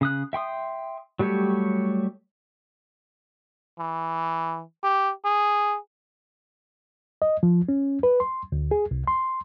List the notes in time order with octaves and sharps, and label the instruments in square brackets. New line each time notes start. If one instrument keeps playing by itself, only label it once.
[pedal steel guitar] C#3 D#6 F#6
E5 G5 C6 D#6
F#3 G3 A3 G4 C#5
[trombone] E3
G4
G#4
[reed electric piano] D#5
F3
C#4
B4
C6
D2
G#4
C2
C6